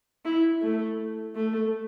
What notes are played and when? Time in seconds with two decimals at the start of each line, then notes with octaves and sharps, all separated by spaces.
0.25 E4
0.62 A3
1.36 A3